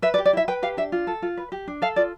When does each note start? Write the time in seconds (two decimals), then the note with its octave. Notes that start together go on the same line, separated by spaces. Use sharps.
0.02 B4 E5
0.14 D5
0.18 G4
0.25 D5
0.33 E4 E5
0.48 B4 G5
0.63 G4 F5
0.77 D4 E5
0.92 F4
1.07 A4
1.22 F4
1.37 B4
1.52 G4
1.67 D4
1.82 A4 F5
1.96 F4 D5